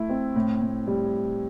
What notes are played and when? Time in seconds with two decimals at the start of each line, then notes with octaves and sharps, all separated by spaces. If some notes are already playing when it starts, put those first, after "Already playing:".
Already playing: A3 E4
0.09 C4
0.36 A2
0.61 A2
0.87 G3